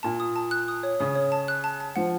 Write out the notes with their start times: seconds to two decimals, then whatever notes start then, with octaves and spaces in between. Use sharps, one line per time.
0.03 A#2 A5
0.20 D#6
0.36 A5
0.51 F#6
0.68 D#6
0.83 C#5
1.00 C#3 D#6
1.15 C#5
1.32 A5
1.48 F#6
1.64 A5
1.80 A5
1.96 F3 F#5